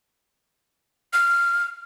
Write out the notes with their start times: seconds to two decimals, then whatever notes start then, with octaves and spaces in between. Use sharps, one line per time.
1.13 F6